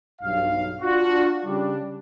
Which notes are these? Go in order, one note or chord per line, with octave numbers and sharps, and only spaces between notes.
B1 G2 F5
D4 F4 F#4
C#3 G3 D4